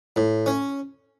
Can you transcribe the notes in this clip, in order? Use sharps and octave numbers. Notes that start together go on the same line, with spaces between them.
A2
C#4